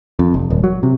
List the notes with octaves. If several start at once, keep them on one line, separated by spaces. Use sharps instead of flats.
F2
F1
D#1
F#3
C3